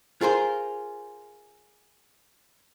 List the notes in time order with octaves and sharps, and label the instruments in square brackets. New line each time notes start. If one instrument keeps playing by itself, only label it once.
[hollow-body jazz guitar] F4 G#4 A#4 C5